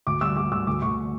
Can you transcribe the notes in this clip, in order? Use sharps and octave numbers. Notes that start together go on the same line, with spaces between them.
D2 D6
G3 E6
G3 D6
D2 E6
D2 D6
D2 C#6